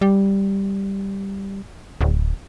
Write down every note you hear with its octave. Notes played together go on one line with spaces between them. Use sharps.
G3
D1